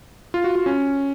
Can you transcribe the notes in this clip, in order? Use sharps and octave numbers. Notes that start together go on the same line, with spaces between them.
F4
F#4
F4
C#4